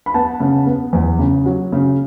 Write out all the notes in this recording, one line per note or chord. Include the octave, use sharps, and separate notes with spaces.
B5
B3 F#5 A5
C#3
B3
E2
C#3
F#3
C#3